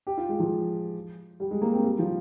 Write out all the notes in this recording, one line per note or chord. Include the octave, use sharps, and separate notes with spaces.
G4
F4
G#3
F3
G3
G#3
A#3
C4
G3
F3